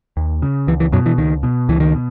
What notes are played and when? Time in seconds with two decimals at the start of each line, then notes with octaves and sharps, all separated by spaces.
0.17 D#2
0.42 C#3
0.67 C#2 E3
0.80 E3
0.92 F#2 B2 F#3
1.06 E3
1.18 C#2 D#3
1.43 B2
1.69 C#2 E3
1.80 D#3
1.94 B2